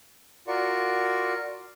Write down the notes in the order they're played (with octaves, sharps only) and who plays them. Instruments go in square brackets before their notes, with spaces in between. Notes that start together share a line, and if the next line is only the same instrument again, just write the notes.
[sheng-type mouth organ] F4 F#4 A#4 D5 C#6